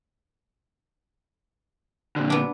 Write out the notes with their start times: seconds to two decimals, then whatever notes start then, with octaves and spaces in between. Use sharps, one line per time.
2.16 A#2 D3
2.30 B3 D4